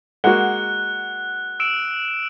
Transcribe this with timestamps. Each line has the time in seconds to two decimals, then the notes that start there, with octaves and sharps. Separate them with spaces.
0.24 G#3 A#3 F#4 F#5 F#6
1.60 E6 D7 E7